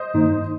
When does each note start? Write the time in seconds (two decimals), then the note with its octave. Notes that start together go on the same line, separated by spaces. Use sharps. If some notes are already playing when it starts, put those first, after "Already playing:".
Already playing: C5 D#5
0.14 G2 D#3 A#3 D#4